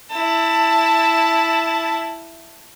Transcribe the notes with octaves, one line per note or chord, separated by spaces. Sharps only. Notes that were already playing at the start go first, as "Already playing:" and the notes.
E4 A5